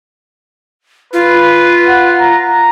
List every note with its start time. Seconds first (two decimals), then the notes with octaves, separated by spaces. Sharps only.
1.13 F4 B4
1.88 F#5
2.20 A#5